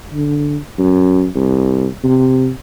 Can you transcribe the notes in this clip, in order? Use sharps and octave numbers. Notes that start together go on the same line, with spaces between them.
D3
F#2
C2
C3